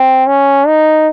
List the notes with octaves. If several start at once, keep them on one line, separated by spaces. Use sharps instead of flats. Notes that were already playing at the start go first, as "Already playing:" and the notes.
Already playing: C4
C#4
D#4